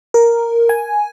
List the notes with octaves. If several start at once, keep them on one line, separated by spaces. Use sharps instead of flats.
A#4
G#5